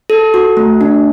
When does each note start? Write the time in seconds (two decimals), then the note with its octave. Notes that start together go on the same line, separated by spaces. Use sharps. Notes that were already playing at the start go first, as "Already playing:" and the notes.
0.10 A4
0.34 F#4
0.57 A3
0.81 D4